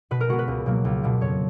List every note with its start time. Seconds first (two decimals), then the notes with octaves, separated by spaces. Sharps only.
0.11 B2 B4
0.20 A#4
0.29 G#3 B3 F#4
0.39 B4
0.48 C#2
0.66 B2 F#3 A#3
0.85 C#2
1.03 B2 A#3
1.21 F2 C#5